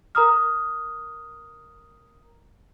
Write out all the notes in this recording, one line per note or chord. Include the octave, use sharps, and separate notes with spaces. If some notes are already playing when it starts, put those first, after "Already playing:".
A#4 A#5 D#6 F6